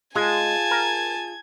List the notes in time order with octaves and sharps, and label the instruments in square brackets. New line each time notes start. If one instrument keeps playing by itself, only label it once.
[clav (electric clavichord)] G#3 [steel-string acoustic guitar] F4 G#4 F5 [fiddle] G#5 A5 [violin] G#6
[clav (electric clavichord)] A#4